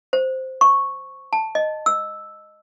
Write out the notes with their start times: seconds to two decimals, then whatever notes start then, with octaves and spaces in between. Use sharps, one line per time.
0.13 C5
0.61 C#6
1.33 A5
1.55 D#5
1.86 E6